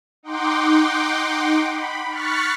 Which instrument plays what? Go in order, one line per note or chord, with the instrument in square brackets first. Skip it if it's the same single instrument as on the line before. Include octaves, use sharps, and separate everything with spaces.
[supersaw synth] D#4 F#5 G5 C6 D6
B5
C#6 F6 F#6 A6 B6 C#7